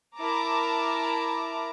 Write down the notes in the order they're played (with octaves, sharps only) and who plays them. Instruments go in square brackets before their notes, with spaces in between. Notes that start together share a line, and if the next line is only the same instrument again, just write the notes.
[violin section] E4 A#4 A5 A#5 D6